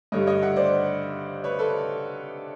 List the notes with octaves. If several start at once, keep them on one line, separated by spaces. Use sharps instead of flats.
G2 D3 G3 C#5 D#5
C#5 D#5
E5 F#5
C5 D5
B4 C#5
A4 B4